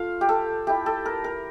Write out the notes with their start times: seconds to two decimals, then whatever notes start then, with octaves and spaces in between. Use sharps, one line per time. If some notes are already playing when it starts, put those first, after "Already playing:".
Already playing: A3 F4 F5
0.21 G4
0.29 A4
0.67 A3 E4 G4
0.86 A4
1.05 A#4
1.24 A#4